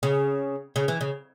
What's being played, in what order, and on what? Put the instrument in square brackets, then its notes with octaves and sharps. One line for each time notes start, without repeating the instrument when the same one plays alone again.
[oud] C#3
C#3
E3
C#3